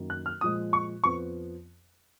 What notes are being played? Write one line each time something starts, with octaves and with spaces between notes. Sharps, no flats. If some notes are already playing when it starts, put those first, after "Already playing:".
Already playing: F#2 D#3 F#3 A#3
F#6
F6
A#2 F3 G#3 D#6
C#6
F2 F3 B3 C#6